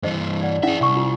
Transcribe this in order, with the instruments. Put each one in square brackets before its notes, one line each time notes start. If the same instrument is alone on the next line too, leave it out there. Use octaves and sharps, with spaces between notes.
[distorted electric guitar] G2 E3 [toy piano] C5 D#5
[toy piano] D5 F#5
[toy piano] C#4 E4 F#5 [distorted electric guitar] G#4 E5
[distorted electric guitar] C2 [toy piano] G#5 C#6
[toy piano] F4